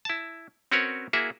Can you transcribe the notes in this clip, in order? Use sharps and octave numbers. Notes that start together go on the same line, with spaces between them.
E4 A5
C4 C#4 F#4 A#4 B4 C#5
A#3 E4 F#4 G#4 E5